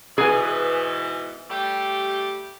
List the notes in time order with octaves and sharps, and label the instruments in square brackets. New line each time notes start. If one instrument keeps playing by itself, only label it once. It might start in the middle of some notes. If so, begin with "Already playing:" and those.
[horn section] G#2 B2 E3 [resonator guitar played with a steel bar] G#4 G#5
[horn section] G3 A3 G4